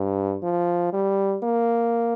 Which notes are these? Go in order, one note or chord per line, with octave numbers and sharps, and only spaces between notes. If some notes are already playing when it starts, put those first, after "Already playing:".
Already playing: G2
F3
G3
A#3